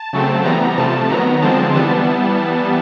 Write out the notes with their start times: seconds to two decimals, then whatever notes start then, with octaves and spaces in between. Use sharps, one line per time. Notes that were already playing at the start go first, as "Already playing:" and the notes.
Already playing: A5
0.13 C#3 F#3 A3 C4
0.45 E3 G3 B3 A#5
0.77 C3 F3 A3 A5
1.09 D#3 F#3 B3 A#5
1.42 D3 F3 G#3 C4 A5
1.75 E3 G3 B3 A5